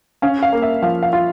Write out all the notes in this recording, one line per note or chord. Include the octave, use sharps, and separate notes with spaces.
C#4 F5
F5
A#3
E5
F3 F5
F5
F4